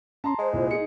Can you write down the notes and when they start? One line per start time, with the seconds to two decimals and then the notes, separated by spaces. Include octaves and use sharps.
0.24 C#4 A5 A#5 C6
0.39 G#3 C5
0.53 C2 A#2
0.71 D#4 G#4 C#7